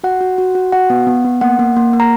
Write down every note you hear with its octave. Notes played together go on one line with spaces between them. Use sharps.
F#4 F#5
F#4
F#4
F#4
F#4 F#5
B3
B3
B3
A#3 F#5
A#3
A#3
A#3
A#5